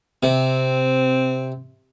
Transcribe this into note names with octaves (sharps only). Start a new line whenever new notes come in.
C3 C4